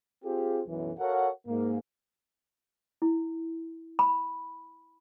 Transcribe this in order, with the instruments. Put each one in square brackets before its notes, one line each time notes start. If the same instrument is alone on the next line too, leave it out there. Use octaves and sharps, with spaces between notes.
[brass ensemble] C4 F4 G4 G#4
B1 F#2 E3
F#4 A4 A#4 C#5 F5 F#5
G#2 A#3
[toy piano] E4
B5